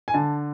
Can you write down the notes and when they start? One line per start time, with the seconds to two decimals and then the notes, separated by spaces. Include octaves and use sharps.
0.08 G#5
0.14 D3 A5